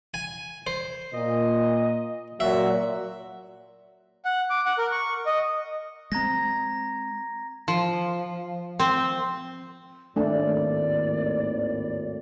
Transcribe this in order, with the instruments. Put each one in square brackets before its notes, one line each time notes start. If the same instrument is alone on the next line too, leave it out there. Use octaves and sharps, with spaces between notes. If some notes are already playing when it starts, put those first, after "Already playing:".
[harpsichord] G#5
C5
[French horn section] A#2 [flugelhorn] D#5
[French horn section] A#2 F#3 [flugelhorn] F#4 [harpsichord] E5
[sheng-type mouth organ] F#5
D6
F#5
A#4
C#6
D#5
[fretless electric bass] G#3 C4 [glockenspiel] A#5 G#6 A#6
[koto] F3
C4
[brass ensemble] G#1 D#2 A2 [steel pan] A3 D4 A4 [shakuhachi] D5